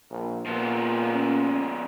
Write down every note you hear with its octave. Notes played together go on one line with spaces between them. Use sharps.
A#1
A#2 F3 B3
C#4